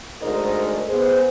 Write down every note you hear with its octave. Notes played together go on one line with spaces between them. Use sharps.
D2 G#2 A#4 C5 D#5
B3 G#4 C5